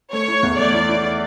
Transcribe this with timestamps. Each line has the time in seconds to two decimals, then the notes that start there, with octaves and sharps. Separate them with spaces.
0.12 A3 C#5
0.28 E4
0.43 E2
0.58 A3 D5
0.74 E4
0.89 E4